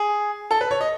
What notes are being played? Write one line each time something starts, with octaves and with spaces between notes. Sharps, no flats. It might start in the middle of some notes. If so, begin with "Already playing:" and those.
Already playing: G#4
A4
B4
C#5
D#5